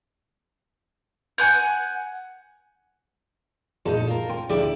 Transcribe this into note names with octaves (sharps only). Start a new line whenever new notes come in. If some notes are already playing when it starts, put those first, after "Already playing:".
F#5 G#5 F#6 G6
A#1 E2 D#4 A4
F4 A#4
C4
D2 C#3 D4 E4 G4 D5